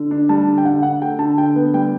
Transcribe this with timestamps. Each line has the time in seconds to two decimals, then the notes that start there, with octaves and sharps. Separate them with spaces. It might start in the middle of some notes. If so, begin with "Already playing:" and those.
Already playing: D3
0.11 D4
0.29 G3 A5
0.47 D3
0.58 G5
0.65 D3 F#5
0.83 D4 F#5
1.02 A3 G5
1.19 D3 A5
1.38 D3 G5
1.56 B3
1.74 G3 G5